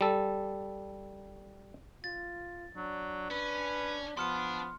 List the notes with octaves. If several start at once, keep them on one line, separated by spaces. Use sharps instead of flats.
G3 A4
F4 A6
F#3 D4
C#4 B4
F3 B3 D4 A5 C6 F6 C#7